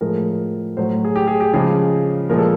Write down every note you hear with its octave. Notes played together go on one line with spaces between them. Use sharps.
A2 F3 G#3 A#4
A2 F#3 C5
G#4
G4
G#4
G4
C#3 F3 G#3 G#4
A#2 F3 G#3 A#4
A4